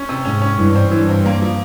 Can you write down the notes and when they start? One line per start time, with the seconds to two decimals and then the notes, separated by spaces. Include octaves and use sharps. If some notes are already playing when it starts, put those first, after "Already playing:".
Already playing: C#4
0.09 C3
0.25 G#2 C#4
0.42 C#4
0.59 G2 E3
0.75 C4
0.91 G2 E3
1.09 C4
1.26 A#3
1.42 F3